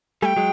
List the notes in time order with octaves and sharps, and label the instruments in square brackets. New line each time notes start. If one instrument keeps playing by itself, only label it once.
[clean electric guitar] G3 A3 [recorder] G5 G#5
[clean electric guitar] F#3 G#3